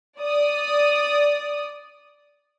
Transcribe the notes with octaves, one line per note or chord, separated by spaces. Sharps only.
D5 D#6